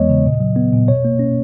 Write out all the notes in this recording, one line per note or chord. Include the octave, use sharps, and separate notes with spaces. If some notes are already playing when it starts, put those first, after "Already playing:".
Already playing: E2 E3 G#3 B3 C#5 D#5
C#3
A#2
F#3
B3
A#2
B2 C#5
A#3
C#4